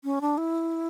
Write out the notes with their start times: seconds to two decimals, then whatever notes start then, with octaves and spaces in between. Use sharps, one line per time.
0.04 C#4
0.21 D4
0.38 E4